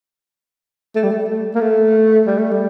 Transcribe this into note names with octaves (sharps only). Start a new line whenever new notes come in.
A3
G3
A3
A3
A#3
A3
G3
A3
G3